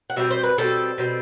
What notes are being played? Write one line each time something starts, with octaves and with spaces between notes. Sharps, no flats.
F#5
B2 G3 C4 E5
C5
B4
B2 G3 C4 A4
B2 G3 C4